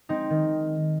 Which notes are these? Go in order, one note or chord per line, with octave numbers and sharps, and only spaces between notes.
G#3 C4 D#4
D#3